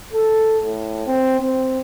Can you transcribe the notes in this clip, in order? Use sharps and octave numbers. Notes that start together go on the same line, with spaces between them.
A4
A2
C4
C4